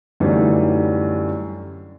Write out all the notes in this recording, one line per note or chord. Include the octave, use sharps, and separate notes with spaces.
F#2 A2 D3 E3 G3 D#4